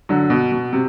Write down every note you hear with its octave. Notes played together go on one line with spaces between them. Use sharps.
D3 F#3
B2
B2
C3